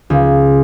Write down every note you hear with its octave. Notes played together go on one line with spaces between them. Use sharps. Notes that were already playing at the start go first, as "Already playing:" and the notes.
C#2